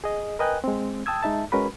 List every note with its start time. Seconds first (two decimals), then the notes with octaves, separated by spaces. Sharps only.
0.04 G#4 D#5
0.39 A#4 B4 D#5 G5 G#5 F#6
0.64 G#3 C4
1.06 G5 A5 D#6 E6 G#6
1.23 G#3 D#4 E5 A5
1.52 G#3 C#4 F#4 A#4 B4 B5